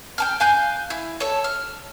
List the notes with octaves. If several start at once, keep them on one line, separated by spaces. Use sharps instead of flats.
G5 A5 F6
F5 G#5 F#6 G6
E4
A4 C#5
F6